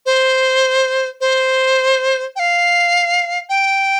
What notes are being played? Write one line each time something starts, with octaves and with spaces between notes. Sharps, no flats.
C5
C5
G5
F5
G5